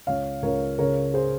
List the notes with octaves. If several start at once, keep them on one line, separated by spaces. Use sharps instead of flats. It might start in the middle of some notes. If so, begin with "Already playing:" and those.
C#2 C#5 F5
C#2 A#4 C#5
C#3 A#4 C#5
G#4 C5